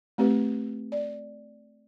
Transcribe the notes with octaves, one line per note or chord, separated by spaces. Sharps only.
A3 C4 G4 B4
D5